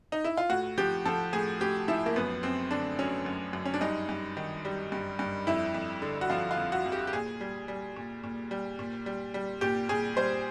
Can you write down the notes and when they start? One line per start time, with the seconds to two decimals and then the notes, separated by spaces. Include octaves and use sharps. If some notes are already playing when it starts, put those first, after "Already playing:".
0.12 D#4
0.24 E4
0.37 F4
0.50 A2 F#4
0.78 F3 G4
1.05 F3 A4
1.33 A2 G#4
1.60 A2 G4
1.88 F3 E4
2.06 A#3
2.16 F#2 B3
2.43 F#2 C4
2.71 D3 D4
2.99 F#3 C#4
3.26 F#2
3.53 F#2
3.65 C#4
3.74 D4
3.81 G2 D#4
4.09 G2
4.37 D#3
4.65 G3
4.92 G2
5.19 G2
5.47 F2 E4
5.74 F2
6.02 D3
6.21 F#4
6.30 F3 F4
6.51 F4
6.58 F2
6.72 F#4
6.86 F2
6.92 G4
7.07 G4
7.13 A#2 G#4
7.41 G3
7.68 G3
7.96 A#2
8.23 A#2
8.51 G3
8.79 A#2
9.06 G3
9.34 G3
9.61 A#2 G4
9.89 A#2 G#4
10.17 G3 C5